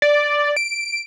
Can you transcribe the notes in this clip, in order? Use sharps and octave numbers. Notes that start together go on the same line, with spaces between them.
D5
D7